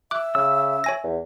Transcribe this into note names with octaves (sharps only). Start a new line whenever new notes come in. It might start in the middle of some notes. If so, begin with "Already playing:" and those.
E5 D6 F#6
C#3 E6
C#5 G#5 A#6
E2